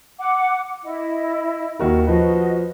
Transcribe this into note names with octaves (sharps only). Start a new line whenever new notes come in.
F#5 D6
E4 D#5
D#2 F#4 A#4
F3 F#4 B4 D#5